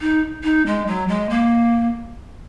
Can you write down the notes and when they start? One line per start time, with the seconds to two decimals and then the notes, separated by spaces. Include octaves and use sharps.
0.01 D#4
0.43 D#4
0.66 G#3
0.86 F#3
1.08 G#3
1.29 A#3